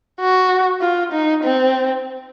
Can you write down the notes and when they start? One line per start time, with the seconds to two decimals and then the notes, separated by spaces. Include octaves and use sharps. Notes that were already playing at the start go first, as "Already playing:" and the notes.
0.20 F#4
0.81 F4
1.12 D#4
1.44 C4